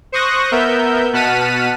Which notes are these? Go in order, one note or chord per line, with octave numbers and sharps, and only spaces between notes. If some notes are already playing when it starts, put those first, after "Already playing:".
C5 C#6 D#6 F#6 A#6
B3 A#4 E5 G6
B2 F#5 A5 F6 B6 D#7